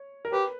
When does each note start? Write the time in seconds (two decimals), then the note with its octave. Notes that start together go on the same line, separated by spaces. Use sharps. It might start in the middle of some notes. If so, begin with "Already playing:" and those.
Already playing: C#5
0.25 A#4
0.32 G4 B4